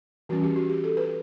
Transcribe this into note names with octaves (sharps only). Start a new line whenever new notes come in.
E3 G3 C#4 F#4
G4
F#4
G4
A4
B4